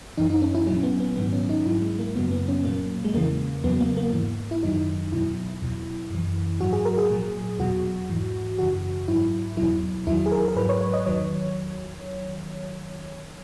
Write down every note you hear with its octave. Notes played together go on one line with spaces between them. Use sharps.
F#2 E3 D#4
D#4
C#4
E4
A#2 F#3 C#4
B3
B3
G#2 D#3 F#3 B3
C#4
D#4
G#2 F#3 E4
G#3
A#3
F#2 C#3 F#3 B3
B3
C#4
A#2 F#3 A#3
G#3
E2 C#3 E3 A#3
E2 C#3 F#3 B3
A#3
A#3
G#2 E3
E4
F#2 D#3 F#3 D#4
E2 B2 F#3 E4
E2 B2 F#3
F#2 E3
G#2 F#3 F#4
G#4
A#4
G#4
A#2 F#3
E2 B2 F#3 F#4
G#2 E3
F#2 C#3 E3 F#4
G#2 F#3 E4
E2 B2 F#3 E4
E2 D#3 F#3 E4
G#4
A#4
A#4
G#2 F#3 B4
C#5
C#5
D#5
E2 D#3 F#3 C#5